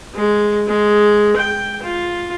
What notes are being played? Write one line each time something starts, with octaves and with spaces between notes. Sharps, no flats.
G#3
G#3
G5
F4